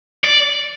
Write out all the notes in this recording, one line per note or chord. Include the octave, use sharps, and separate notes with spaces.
D5